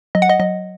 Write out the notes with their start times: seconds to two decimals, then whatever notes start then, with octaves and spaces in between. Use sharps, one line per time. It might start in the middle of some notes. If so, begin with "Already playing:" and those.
0.15 F#3 D#5
0.22 F#5
0.29 D#5
0.40 F#3 D#5